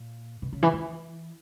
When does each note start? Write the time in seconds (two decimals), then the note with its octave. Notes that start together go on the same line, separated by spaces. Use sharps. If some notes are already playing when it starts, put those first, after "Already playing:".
Already playing: A#2
0.42 B2
0.53 C#3
0.62 E3
0.73 E3